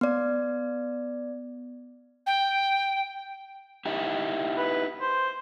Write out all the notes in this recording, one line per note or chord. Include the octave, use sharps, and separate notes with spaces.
B3 D5
G5
D#4 E4 G4
B4
C5